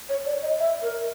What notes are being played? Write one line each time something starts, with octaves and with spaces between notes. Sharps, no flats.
C#5
D5
D#5
E5
A#4